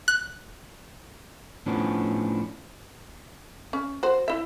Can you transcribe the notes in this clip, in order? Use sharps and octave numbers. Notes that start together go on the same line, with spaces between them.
F#6
A2 F3 B3 C#4 D4
C#4
F#4 C5
E4 E5